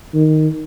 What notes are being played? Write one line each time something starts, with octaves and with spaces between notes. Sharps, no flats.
D#3